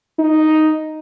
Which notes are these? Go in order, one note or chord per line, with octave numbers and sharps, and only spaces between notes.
D#4